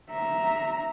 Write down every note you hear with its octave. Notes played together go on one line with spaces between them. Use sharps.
E5 A#5